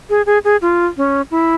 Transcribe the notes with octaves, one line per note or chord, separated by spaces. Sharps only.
G#4
G#4
G#4
F4
C#4
E4